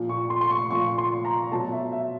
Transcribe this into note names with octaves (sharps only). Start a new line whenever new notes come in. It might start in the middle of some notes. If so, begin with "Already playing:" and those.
Already playing: A#2 F3
C#6
C6
C6
C#6
A#2 F3 C#6
C6
A#5
B2 F#3 A5
E5
E5